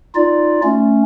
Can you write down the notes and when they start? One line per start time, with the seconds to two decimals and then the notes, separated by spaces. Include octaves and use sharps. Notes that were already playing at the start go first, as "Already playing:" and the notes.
0.15 D#4 F4 D5
0.64 A3 C#4